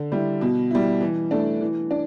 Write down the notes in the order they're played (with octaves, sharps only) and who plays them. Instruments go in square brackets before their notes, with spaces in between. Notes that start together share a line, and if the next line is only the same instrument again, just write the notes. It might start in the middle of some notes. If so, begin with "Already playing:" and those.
Already playing: [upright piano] D3
G3 E4
B2
G3 E4
E3
A3 D4
E3
D4